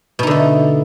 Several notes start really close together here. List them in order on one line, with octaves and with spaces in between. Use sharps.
B2 D#4 D3 A3